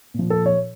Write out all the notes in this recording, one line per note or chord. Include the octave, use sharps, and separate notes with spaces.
A#2 F3
A4
C#5